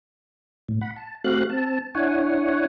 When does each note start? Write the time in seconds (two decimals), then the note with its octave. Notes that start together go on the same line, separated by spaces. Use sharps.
0.69 A2
0.81 F#5 B5
0.96 A5
1.24 A3 C4 F#4 G4 F5 F#6
1.50 C4 A5
1.95 D4 E4 C#5 F#5 G#5